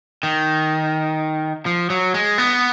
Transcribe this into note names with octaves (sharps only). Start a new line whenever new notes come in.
D#3
F3
F#3
G#3
B3